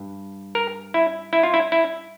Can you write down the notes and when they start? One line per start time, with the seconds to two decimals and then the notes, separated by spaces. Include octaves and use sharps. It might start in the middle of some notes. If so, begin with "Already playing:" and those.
Already playing: G2
0.55 A#4
0.94 E4
1.33 E4
1.43 F4
1.54 E4
1.72 E4